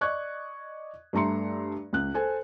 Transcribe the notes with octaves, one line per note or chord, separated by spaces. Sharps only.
D5 D#5 C#6 F#6 G#6
G2 A3 E5 A#5 C6 C#7
C#2 F#6
A4 C5 G#5